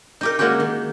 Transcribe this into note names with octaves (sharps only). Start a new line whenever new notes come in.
D#4 G4 A#4
G#3 A#3 C#4 F#4 G4
D#3